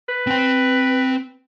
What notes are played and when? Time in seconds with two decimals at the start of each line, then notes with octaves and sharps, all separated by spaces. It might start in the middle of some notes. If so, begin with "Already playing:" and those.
0.09 B4
0.27 C4 G5